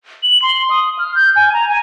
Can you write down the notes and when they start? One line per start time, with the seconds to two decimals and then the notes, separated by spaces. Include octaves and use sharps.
0.23 F#7
0.42 C6
0.70 D#6
0.99 F6
1.15 G6
1.36 G#5
1.54 A#5
1.69 G#5